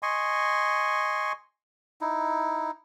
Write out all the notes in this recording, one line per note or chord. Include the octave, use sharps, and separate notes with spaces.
D#5 G#5 C6 C#6
D#4 E4